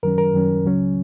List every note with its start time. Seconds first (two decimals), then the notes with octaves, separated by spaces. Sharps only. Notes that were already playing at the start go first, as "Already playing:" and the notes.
0.03 F#2 D#3 F#3 C#4 A#4
0.18 A#4
0.34 F#2 D#3 F#3 C#4
0.65 C#2 C#3 F#3 C#4